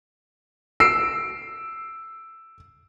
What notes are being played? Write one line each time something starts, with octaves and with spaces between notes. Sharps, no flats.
E6 C7 D7